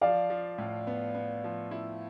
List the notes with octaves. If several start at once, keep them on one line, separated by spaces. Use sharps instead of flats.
F3 D5 F5
F3
A2
B3
B3
F3
E4